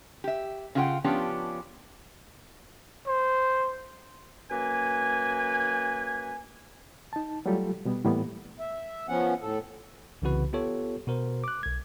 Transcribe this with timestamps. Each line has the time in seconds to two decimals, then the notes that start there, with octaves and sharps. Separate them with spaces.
0.24 G4 E5
0.75 C#3 E4 F4 G#4 F#5 G5
1.04 F3 B3 C#4 D4 F4 G4
3.07 C5
4.51 F#2 A#3 B4 G#5
7.13 D#4 A5
7.46 F#3 G3 A3 F4 G4 A4
7.85 B2 G3 B3
8.05 A2 E3 G3 A#3 B3
8.60 E5
9.09 F3 B3 C#4 F#5
9.42 A2 A4
10.22 C2 C#3 E3 C4 F#4 B4
10.53 B3 F4 G4 A4 C#5
11.07 B2 F#4 A#4 C5
11.44 D6 F#6
11.63 B1 G#6